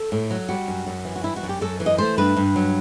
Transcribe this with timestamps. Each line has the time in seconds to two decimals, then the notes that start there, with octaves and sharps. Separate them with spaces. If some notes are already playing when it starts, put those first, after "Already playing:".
Already playing: A4
0.12 A2
0.31 F#3
0.49 G3 F#4
0.68 F#2
0.87 F#2
1.05 E3
1.16 F#4
1.24 G3 E4
1.36 F#4
1.43 F#2
1.49 G4
1.61 F#2 A4
1.80 E3
1.86 D#5
1.98 A3 C5
2.18 G2 B4
2.37 G2
2.56 F#3